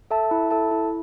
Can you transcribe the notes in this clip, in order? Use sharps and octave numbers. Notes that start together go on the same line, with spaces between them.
A4 E5 A5
E4
A4 E5 A5
E4